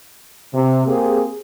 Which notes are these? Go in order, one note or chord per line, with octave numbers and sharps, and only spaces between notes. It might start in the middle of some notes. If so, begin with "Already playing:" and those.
C3
A#3 C4 G4 G#4